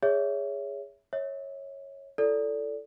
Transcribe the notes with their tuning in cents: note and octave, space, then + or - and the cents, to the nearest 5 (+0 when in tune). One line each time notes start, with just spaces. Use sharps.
G#4 -15 C#5 +15 E5 +0
C#5 -10 E5 -40
E4 +40 A4 +5 D5 -20